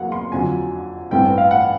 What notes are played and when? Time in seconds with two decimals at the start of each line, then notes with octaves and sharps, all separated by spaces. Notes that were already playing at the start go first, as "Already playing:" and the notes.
Already playing: E2 C#3 F#3 A#3 F5 F#5
0.12 C6
0.31 F2 D3 F#3 G#5
1.11 A1 G2 E3 A3 C4 G5
1.38 F5
1.51 F#5